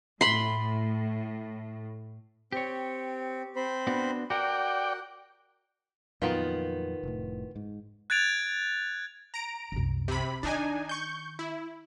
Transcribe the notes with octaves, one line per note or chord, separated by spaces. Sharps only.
A2 B5 C6
C4 G4 C#5
C4 C5 B5
B3 D4 F#4
F#4 A#4 D5 F#5 G5
F2 A#2 D#3 F#3 B3 F4
F1 A2
G#2
F#6 G#6 A6 D7 F7
A#5 D7
C2 F#2
C3 B5
D#3 D4 D#4 G#5
C#6 G6
E4